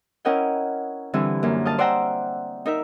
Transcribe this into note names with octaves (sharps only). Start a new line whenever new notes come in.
C#4 E4 A#4 D#5 F#5 G5
D3 E3 G3 C4 E4
F#2 A#3
D#5 F5 A5
C5 D5 E5 F#5 G5 A#5
D#4 A#4 E5